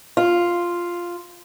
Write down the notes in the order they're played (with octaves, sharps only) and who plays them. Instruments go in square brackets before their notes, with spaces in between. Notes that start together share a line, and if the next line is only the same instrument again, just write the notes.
[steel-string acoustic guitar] F4